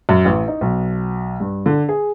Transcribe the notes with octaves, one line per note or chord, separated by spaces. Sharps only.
F#2
A1
D#4
B1
G2
D3
G#4